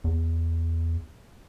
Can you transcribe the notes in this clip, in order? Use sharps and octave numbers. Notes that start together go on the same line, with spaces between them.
E2